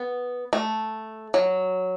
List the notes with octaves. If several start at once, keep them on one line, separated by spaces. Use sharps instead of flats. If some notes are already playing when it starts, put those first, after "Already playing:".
Already playing: B3
A3
F#3